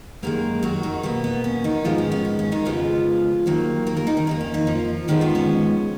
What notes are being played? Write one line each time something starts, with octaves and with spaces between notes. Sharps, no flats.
F#2 D#3 G#3 A#3 A#4
F#3 F#4
D#3 D#4
B2 A#3 B3
B3
C#4
D#3 D#4
G#2 D#3 F3 G#3 B3 F4
C#4
C#4
B3
C#4
D#3 D#4
F2 C#3 F3 G#3 B3 F4
D#2 D#3 F#3 A#3
A#3 A#4
A#3 A#4
D#3 D#4
D#3 D#4
F2 D#3 A#3
C#4
D#3 D#4
F3 F4
G#2 D#3 F3 G#3 B3 D#4
D#3 D#4
C#4